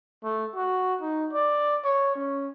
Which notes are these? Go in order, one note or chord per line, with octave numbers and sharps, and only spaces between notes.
A3
F#4
D#4
D5
C#5
C#4